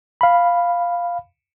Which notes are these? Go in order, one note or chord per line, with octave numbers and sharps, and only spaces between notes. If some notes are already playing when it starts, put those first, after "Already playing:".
F5 B5